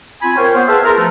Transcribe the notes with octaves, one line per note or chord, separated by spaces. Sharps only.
C4 F4 G#5 B5
A#4 C5 C#5 F5 G5
B3 C5
G#4 B4 E5 F5 A5
F4 A#4
F3 A3